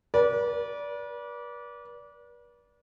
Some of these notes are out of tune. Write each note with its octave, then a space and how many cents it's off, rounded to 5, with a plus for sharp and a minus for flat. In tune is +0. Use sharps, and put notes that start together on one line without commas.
B4 -40 D5 -20